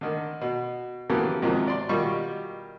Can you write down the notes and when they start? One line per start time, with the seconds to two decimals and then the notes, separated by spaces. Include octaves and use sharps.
0.01 D3 D#3
0.41 B2
1.10 C#3 E3 F#3 G4 A4 A#4
1.42 G#2 C3 D#3 F3 F#3
1.67 D5 C6
1.89 B2 D#3 G3 F4 C#6